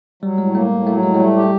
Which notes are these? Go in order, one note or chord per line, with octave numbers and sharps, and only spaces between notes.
F#3 G3
A2 G#3
A3 A#3
A2
F#3 A3
A2 G#3
G#3
G3 A3
G4